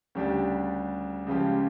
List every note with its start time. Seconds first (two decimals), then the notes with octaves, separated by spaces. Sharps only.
0.15 D2 C#3 G3 D4 G4
1.27 C#2 C#3 F3 C#4 G4